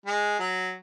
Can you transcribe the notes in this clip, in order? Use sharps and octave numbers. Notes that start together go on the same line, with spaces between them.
G#3
F#3